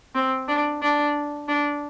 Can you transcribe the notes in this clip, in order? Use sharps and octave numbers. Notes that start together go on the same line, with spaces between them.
C4
D4
D4
D4